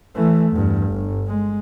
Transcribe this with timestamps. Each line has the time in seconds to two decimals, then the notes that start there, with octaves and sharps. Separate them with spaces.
0.15 E3 A3
0.52 E2 G2
0.88 G1
1.27 G#3